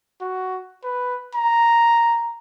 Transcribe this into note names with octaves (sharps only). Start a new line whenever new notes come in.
F#4
B4
A#5